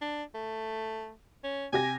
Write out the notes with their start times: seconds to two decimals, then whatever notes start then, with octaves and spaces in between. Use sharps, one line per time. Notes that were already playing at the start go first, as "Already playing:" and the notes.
0.01 D4
0.34 A3
1.44 C#4
1.73 C3 G4 G#5 A#6